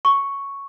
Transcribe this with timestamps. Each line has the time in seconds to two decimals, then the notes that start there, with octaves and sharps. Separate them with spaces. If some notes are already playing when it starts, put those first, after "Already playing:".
0.05 C#6